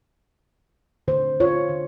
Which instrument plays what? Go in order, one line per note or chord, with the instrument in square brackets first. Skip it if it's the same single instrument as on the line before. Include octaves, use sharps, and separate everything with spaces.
[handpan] D3 C5
F4 C#5
D3